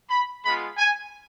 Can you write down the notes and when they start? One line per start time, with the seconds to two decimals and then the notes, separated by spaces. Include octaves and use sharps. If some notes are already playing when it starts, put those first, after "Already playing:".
0.10 B5
0.44 G#3 B3 F4 B5
0.78 G#5